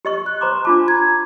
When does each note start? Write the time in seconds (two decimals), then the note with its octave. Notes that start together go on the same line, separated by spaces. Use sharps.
0.05 G4 D#5 C#6
0.26 F#6
0.41 C5 A#5 C6 D6
0.65 D4 F4 A5 D6
0.88 A#5 G#6